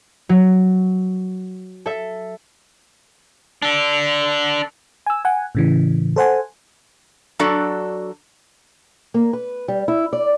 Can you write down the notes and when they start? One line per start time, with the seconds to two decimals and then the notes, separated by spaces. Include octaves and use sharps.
0.29 F#3
1.86 A4 E5
3.62 D4 A4
5.06 G#5 E6
5.25 F#5 G#5
5.55 A2 C#3 E3
6.16 A4 C5 F#5 G#5
7.39 F#3 D4 F#4 A4 D5
9.14 A#3
9.33 B4
9.68 G3
9.88 E4
10.13 D5